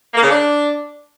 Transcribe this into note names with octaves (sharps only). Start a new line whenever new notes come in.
A#3
C#3
D4